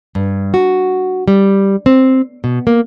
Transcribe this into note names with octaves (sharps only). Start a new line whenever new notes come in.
G2
F#4
G3
C4
B2
A#3